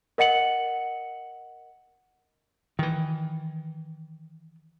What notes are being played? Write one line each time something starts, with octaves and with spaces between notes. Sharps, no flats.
A#4 D#5 F#5 C#7 F#7
D#3 E3